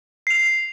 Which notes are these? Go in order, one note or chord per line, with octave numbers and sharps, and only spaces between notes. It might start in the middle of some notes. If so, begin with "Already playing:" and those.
C7 F7